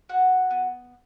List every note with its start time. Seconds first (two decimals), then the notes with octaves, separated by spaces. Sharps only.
0.09 F#4 F#5
0.50 B3